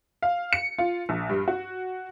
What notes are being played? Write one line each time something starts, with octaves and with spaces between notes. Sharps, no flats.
F5
C#7
F4
A#1
G2
F#4